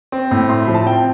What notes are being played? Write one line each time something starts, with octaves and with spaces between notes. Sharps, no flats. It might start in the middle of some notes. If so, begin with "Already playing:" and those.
C4
A2
E4 C6
B5
F3
A5
C4 G5